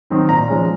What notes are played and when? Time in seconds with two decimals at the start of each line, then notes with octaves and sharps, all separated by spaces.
0.10 D#3 F#3 C4 D#4
0.29 A#2 A#5
0.48 F3 G#3 C#4